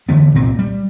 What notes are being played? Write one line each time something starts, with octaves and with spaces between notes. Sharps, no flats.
D3 E3 B3
C2 A#2 A#3 C4
G3